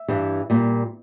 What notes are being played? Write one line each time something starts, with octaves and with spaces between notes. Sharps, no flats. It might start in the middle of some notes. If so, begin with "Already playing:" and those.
Already playing: E5
G2 E3 G3
A#2 G3